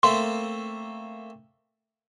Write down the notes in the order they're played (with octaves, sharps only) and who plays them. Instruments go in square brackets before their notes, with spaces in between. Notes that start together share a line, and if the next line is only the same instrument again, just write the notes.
[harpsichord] A3 A#3 C4 [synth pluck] C6